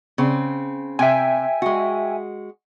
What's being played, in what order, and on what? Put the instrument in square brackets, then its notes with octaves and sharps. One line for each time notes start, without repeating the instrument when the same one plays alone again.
[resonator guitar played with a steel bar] C#3 C4
[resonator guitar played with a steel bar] C3 [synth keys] E5 G5 G#5
[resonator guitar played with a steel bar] G#3 F#4